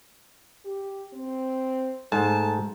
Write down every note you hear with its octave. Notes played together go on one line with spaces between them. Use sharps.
G4
C4
G#2 A3 A5